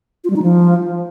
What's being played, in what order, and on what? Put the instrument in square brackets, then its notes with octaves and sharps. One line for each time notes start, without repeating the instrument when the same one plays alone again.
[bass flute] F4
G3
D#4
F3